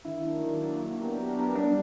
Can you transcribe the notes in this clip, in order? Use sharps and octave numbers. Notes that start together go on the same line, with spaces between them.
D#3 E4
F#3 A#3 D4
D#3
F#3 A#3 D4
F#3
B3 D4 G4 A#4
F#3
B3 D4 G4 A#4
G3 D4